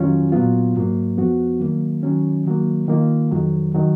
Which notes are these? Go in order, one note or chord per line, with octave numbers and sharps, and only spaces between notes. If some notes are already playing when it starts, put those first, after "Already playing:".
Already playing: F2 D#3 F#3 C#4 F4
A#2 F#3 B3 F4
G#2 F#3 A#3
F2 F3 B3 F#4
D#3 F#3 A#3
D#3 F#3 C#4
D#3 F#3 A#3
D#3 A#3 F4
F2 D#3 F#3
D#3 F#3